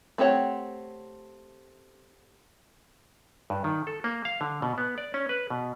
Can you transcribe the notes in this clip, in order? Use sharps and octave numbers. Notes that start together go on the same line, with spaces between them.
A3 C4 G4 C#5 F#5
G2
D#3
A4
A#3
F5
D3
B2
B3
D5
C#4
B4
B2